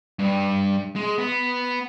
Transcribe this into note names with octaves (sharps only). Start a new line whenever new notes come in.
G2
G#3
B3